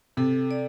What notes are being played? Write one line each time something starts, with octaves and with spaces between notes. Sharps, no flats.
C3 A4
D5